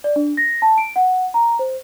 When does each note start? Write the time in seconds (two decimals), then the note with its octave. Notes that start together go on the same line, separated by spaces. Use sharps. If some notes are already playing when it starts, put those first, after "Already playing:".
0.04 D5
0.16 D4
0.37 A#6
0.62 A5
0.78 D7
0.96 F#5
1.34 A#5
1.59 C5